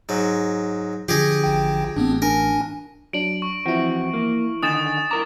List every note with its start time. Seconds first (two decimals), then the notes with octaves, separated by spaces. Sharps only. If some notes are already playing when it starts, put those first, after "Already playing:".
0.09 G#2 F#3
1.09 D3 F3 G4 G#4 D#5
1.44 A1 G5
1.96 A1 B3 C4 D4
2.22 D4 A#4 G#5
3.13 F#3 D4 D7 F#7
3.42 C#6
3.66 E3 F3 C4 E4 F#4
4.14 A#3
4.63 D3 D#3 D#4 G#5 D#6 A6 E7
5.11 E4 A#4 A#5 D6